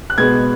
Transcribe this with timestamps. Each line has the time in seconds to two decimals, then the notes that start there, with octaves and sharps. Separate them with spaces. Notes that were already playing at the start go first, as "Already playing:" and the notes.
0.10 F#6
0.18 B2 G#3 B3 G#6